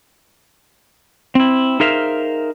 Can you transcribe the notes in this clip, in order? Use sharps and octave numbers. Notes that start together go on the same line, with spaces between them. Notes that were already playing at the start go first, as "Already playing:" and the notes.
C4 E4
D#4 G#4 A#4 C5 E5 F5